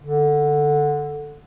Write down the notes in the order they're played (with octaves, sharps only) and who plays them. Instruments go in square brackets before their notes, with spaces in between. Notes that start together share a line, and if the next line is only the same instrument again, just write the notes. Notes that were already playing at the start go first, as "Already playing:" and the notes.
[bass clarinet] D3